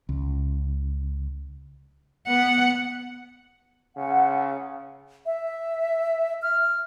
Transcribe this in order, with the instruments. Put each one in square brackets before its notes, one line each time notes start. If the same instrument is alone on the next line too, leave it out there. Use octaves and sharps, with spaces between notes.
[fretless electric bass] C#2
[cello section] B3 [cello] F#5
[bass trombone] C#3 [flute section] F#5
[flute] E5
F6